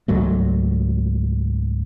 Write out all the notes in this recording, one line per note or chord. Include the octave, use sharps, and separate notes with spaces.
C#2 G#2 F#3 A3